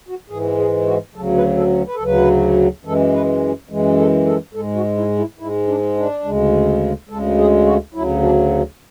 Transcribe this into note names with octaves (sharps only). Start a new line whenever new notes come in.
F#4
G#2 E3 G#3 G#4
G#4
F#4
D2 C#3 F#3 A4
B4
A4
B4
A4
D2 C#3 F#3 B4
F#2 E3 G#3 A4
B4
F#2 E3 G#3
A4
A4
G#2 G#3 A4
F#4
E4
E4
G#2 G#3 E4
D4
D4
D2 C#3 G#3
D2 C#3 G#3 A4
G#4
F#4
D2 C#3 F#3 E4
D4